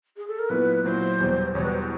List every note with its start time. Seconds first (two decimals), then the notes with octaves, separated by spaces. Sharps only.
0.17 G#4
0.28 A4
0.39 A#4
0.50 A#2 F#3 B3 E4 B4
0.84 A#2 F#3 B3 E4 C5
1.20 E2 B2 G3
1.54 E2 B2 G3 C#5
1.64 B4
1.72 C5